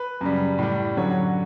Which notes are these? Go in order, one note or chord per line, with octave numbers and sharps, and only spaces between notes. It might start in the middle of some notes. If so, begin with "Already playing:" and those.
Already playing: B4
F#2 C#3 G3
A2 G3
F#2 D3 F#3 C#5